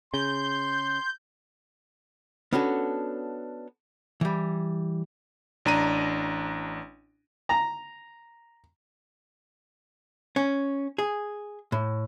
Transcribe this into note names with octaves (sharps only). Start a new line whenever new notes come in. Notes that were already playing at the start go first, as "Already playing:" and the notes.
C#3 C6 G6
B3 C#4 D4 F#4 A4
E3 G3
A1 D4 A#5 D#7
A#5
C#4
G#4
A2